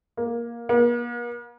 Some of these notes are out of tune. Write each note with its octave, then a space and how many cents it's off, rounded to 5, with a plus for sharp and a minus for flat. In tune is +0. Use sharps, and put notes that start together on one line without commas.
A#3 +10
A#3 +45